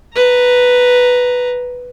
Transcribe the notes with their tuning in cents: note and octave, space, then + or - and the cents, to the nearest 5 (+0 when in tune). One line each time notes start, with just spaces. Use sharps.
B4 +0 A#5 +0